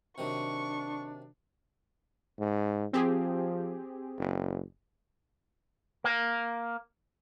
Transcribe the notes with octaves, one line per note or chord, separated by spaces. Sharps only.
C3 D#3 F#3 D4 C#6
G#2
F3 C4 G4 G#4
F#1
A#3